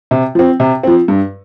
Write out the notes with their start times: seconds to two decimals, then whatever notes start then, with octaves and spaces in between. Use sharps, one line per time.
0.11 C3
0.35 F3 C4
0.60 C3
0.83 F3 C4
1.08 G2